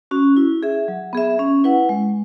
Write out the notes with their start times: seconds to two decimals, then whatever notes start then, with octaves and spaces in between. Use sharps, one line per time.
0.11 C#4 F#4
0.37 E4
0.63 G#4 E5
0.88 F#3
1.13 B3 G#4 E5
1.39 C#4
1.64 E4 B4 F#5
1.89 G#3